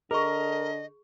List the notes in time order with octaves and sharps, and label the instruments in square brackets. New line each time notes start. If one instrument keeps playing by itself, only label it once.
[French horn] D3 [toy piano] G#4 C#6 [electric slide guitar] A#4 [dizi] D#5